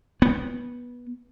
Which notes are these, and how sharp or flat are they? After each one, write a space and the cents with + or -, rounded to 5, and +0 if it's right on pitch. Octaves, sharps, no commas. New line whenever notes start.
B3 -15